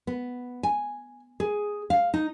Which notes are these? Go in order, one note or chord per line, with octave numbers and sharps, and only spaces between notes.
B3
G#5
G#4
F5
D#4